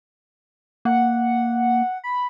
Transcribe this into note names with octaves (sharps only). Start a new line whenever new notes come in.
A#3 F#5
B5